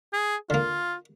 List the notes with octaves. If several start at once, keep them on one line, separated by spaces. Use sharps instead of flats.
G#4
D3 A#3 F4